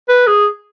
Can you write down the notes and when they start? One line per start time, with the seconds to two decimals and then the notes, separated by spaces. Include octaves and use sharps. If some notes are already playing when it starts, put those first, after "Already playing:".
0.09 B4
0.27 G#4